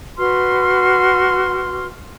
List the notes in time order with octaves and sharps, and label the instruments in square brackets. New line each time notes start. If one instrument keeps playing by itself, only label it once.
[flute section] F#4 B4 C6 F6